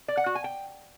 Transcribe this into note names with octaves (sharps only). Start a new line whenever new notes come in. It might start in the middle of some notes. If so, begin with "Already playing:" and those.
D5
F#5
F#4
G#5
G5